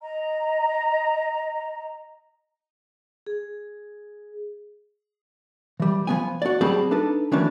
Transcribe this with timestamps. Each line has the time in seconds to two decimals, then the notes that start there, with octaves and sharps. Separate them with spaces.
0.01 D#5 A#5
3.26 G#4
5.80 E3 G3
6.07 F3 F#3 B3 G#5
6.42 F#4 D5
6.61 F#3 G3 C4 G#4 A5 B5
6.91 D4 D#4 A4 B4
7.32 D#3 E3 F#3 A3 C#4 D4